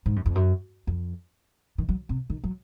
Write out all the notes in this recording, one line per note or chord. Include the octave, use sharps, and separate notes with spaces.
G#2
F#2
F2
F#2
F2
D#3
F#3
C3
D#3
F#3